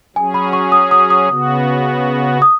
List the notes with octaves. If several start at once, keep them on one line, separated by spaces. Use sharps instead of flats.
F#3 C#4 G#4 G#5
B5
C#6
D#6
D#6
D#6
C#3 B3 F#4
D#6